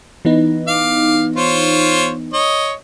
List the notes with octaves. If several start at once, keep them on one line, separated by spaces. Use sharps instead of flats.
E3 B3 D#4
F5 D6
F4 C5 C#5
C#5 D#5